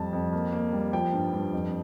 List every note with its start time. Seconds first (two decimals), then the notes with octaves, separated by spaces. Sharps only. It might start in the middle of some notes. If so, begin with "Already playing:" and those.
Already playing: F2 G3 A5
0.13 F2
0.33 A#3
0.52 A#3
0.72 G3
0.93 F3 G5
1.13 G2
1.33 G2
1.53 F2